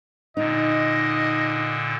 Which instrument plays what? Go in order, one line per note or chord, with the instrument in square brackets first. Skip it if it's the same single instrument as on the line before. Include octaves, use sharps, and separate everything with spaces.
[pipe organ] A#2 D3 [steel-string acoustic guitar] D#4 [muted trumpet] D#5